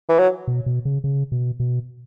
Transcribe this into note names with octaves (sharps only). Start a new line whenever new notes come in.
E3
F#3
B2
B2
C#3
C#3
B2
B2